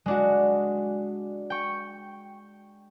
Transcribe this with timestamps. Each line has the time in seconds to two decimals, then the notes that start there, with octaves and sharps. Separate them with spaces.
0.06 G#3 D4 F#4
1.50 G5 C#6